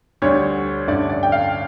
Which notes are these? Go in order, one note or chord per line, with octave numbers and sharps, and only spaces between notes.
D2 D3 G3 C#5
A1 G2 D3 A3 C#4 D5
D5
G5
F5